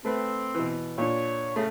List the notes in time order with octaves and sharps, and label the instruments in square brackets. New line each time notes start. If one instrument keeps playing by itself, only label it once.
[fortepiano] A3 B4 [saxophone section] C4
[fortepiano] B2 E3
[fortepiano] A#2 D4 [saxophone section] C#5
[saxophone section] C#3 [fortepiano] A3